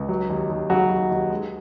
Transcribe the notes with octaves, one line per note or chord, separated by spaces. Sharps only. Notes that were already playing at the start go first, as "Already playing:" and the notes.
Already playing: C#2
F#3
D#2
D#2
C#3 F#3 F#4
F#3
D#2
G#3